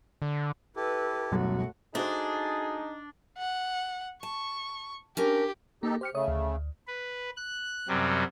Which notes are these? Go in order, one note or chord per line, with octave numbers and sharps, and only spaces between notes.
D3
E4 G4 A4 B4
F#2 B2 G3 A3 F#4
A3 D4 D#4 F#4 G#4 C5
F#5
A5 C#6
C#4 D4 G4 A#4
A#3 D#4 G4 A4
G4 C5 F6 C#7
C#3 A3 C#5 D#6
D2
B4
F#6
F#2 C3 F#3 G3